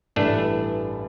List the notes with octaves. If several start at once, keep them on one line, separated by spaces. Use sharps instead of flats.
A1 G2 E3 G3 A3 D4